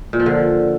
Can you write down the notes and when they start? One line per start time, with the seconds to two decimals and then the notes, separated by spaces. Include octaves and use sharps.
0.13 A#2
0.20 F3
0.26 D3